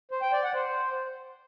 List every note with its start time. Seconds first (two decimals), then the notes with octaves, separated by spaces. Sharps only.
0.11 C5
0.22 G5
0.33 D5
0.43 F#5
0.54 C5